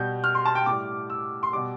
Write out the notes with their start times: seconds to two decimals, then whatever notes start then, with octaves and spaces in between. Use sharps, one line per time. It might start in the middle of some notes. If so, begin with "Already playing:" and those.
Already playing: B2 G3 G6
0.24 F6
0.35 C6
0.45 A5
0.55 G5
0.66 A2 G3 D6
1.10 E6
1.43 C6
1.53 B2 G3 D6